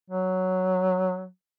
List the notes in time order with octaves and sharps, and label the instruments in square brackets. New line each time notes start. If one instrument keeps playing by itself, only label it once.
[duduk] F#3